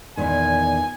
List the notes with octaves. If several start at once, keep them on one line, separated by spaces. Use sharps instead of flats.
E2 A#2 D#3 G#5